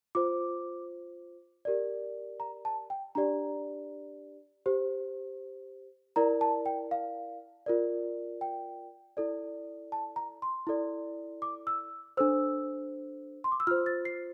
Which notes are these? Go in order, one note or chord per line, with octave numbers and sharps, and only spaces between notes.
F4 C5 D6
G4 A#4 D5
A#5
A5
G5
D4 G4 D5 A#5
G4 C5
E4 A#4 D5 A#5
A5
G5
F5
F4 A#4 D5
G5
E4 A4 D5
A5
A#5
C6
E4 A4 D5
D6
E6
D4 A4 C5 E6
C6
D6
E6
F4 C5 F6
A6
C7